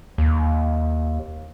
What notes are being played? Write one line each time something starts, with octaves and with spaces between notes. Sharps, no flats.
D#2